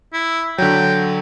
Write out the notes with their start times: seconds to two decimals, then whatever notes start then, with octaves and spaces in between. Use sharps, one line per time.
0.13 E4
0.58 D3 F#3 G5